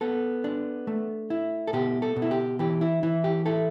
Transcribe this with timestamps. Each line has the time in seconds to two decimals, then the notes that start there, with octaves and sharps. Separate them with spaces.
0.01 B3 A4
0.44 D4
0.87 A3
1.30 E4
1.67 A4
1.73 B2 G4
2.02 A4
2.16 B2
2.22 E4
2.31 G4
2.59 E3 G4
2.81 E4
3.03 E3 E4
3.24 G4
3.46 E4 A4